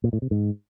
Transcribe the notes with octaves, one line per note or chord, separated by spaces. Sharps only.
A#2
A2
C3
G#2